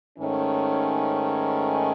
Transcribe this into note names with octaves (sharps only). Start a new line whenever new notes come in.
G#2 D#3 A3 C#4